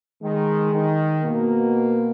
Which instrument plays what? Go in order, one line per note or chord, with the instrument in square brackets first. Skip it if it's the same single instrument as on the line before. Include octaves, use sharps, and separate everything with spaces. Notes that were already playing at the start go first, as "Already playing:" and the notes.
[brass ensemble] D#3 [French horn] G#3
[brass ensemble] D#3
[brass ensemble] B2 [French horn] A#3